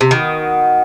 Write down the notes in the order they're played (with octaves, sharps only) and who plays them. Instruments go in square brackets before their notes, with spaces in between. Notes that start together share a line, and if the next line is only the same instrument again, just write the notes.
[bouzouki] C3
[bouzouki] D#3 [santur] B3 F#4 B4